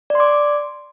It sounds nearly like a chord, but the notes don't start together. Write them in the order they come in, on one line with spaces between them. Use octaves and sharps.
D5 C6 D6